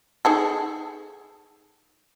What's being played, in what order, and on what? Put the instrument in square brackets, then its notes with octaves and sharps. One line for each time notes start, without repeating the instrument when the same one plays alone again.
[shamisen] D#4 G#4 A4